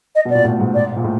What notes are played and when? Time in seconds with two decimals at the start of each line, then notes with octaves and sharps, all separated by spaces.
0.15 D#5
0.25 B2 D5
0.35 A#2
0.44 A2
0.60 G#2
0.74 D5
0.97 A#2
1.04 A2